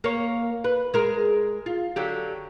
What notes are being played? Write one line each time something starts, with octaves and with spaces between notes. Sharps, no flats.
A#3 C#5
B4
G#3 A#4
F4
D3 F#3 G4